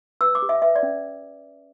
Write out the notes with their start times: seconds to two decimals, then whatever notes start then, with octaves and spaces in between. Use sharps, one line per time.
0.21 B4 E6
0.35 D6
0.42 G4
0.49 E5
0.62 B4 E5
0.76 D5
0.83 C#4